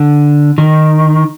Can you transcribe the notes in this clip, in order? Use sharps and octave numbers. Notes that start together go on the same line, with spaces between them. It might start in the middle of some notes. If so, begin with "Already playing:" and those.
Already playing: D3
D#3